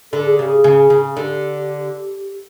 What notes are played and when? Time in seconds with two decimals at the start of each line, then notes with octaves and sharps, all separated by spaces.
0.12 D3 A4
0.24 G#4
0.36 C#3 G4
0.49 G#4
0.64 C#3
0.90 C#3
1.16 D3 G4